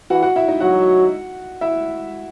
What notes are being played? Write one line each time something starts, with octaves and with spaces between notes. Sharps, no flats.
E3 F#4 F#5
F#4 F#5
E4 E5
D#4 D#5
F#3 F#4 F#5
E4 E5